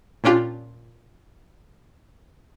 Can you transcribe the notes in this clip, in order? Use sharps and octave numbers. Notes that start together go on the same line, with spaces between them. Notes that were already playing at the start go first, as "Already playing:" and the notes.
A#2 C#4 D4 F4 G4